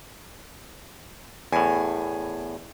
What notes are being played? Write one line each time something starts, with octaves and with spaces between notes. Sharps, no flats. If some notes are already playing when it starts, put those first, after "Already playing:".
E2 A2 G#5